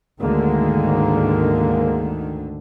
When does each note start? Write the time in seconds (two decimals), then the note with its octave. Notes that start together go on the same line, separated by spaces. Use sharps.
0.22 D2 G#2 D3 D#3 G#3 A#3